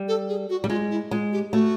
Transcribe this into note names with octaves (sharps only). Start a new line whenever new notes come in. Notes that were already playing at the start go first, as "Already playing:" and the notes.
Already playing: G3
A4
G#4
F#4
G3
G#3 F4
E4
G#3 F4
G4
A3 F#4